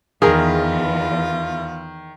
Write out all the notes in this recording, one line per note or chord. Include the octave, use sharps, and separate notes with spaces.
E2 D#3 F4 G#4 A#4